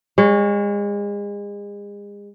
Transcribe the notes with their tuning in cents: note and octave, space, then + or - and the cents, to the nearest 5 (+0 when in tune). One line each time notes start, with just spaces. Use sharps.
G#3 -35 C#5 +0